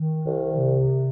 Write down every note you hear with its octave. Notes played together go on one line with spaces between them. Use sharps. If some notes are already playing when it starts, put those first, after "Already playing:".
Already playing: D#3
C2
C3